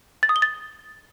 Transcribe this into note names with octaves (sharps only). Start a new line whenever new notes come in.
A6
D#6
G7
A6